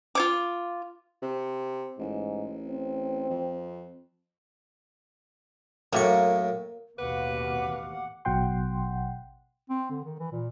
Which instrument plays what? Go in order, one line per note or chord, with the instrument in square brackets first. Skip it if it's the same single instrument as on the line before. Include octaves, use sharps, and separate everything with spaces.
[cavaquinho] F4 C#5 D6
[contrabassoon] C3
[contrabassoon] A1 [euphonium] G#2
[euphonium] C4
[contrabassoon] F2
[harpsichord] F#2 A2 C#6 [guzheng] A#3
[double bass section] A1 D#2 B2 [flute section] F#4 F5 D6 [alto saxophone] B4 [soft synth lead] F#5
[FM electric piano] A1 B2 F#3 F#5 G5 C6
[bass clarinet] C4
D3
D#3
E3
A#2